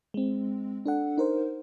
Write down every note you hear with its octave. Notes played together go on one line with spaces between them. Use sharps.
G#3 C4
D4 A4 F#5
D#4 A#4 C5